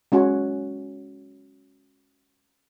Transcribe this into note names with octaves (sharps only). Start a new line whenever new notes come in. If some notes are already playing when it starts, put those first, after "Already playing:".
G#3 C#4 F#4 G#5